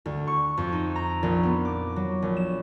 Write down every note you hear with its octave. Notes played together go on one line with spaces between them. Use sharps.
D2
C#6
F2
D#4
A#5
A#1
B3
D6
F#3
A#1
E7